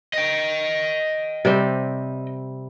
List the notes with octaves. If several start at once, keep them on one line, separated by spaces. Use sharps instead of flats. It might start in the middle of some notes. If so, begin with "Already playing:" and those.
D#5 G5
C3 G3 C4